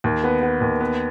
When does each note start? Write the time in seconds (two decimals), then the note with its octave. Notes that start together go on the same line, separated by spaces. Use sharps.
0.04 D#2
0.24 B3
0.43 B3
0.61 D#2
0.80 B3